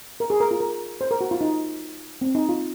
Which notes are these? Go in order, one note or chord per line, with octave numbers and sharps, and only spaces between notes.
A#4
G#4
A#4
F4
A#4
C5
A#4
F#4
F4
D#4
C4
D#4
F4